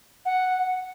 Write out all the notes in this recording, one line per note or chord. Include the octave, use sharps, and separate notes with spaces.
F#5